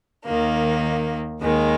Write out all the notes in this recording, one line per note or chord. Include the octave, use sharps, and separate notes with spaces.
D#2 D#3 A#3
D#2 D#3 G#3